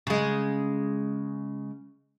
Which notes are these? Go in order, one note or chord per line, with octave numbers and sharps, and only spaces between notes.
C#3 G#3